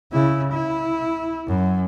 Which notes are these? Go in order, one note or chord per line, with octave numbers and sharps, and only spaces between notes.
C#3 E4
E4
F#2